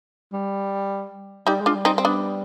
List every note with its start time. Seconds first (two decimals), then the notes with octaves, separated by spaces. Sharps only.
0.33 G3
1.47 G3 D#4 G4
1.60 G#3
1.66 D4 F4
1.75 G3
1.85 C4 D#4
1.98 C4
2.05 B3 D4